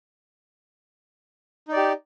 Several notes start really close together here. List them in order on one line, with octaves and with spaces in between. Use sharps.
D#4 D5 G4